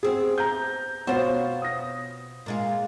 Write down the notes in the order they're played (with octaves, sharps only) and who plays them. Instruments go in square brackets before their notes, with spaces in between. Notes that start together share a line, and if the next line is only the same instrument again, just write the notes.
[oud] B3 C4 [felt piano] G#4
[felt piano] A#5 G6
[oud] B2 F4 C5 [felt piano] B3 F#4 C#5
[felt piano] D#6 A#6
[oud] A#2 G#3 F4